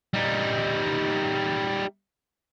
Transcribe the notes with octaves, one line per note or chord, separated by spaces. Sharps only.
G3 D#4